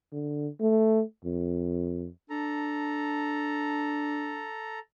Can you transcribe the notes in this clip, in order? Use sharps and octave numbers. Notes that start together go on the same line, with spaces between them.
D3
A3
F2
D4 A4 A#5